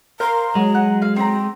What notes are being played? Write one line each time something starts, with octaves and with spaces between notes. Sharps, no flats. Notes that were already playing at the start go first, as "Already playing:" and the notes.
A#4 C5 F5 A#5 C6
F#3 G#3
F#5
F5
C4 G5 A#5